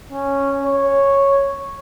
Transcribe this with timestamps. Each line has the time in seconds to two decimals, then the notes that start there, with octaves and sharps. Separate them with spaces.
0.12 C#4
0.65 C#5